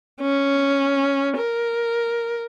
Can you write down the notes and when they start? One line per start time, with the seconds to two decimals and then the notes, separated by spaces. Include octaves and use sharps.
0.21 C#4
1.37 A#4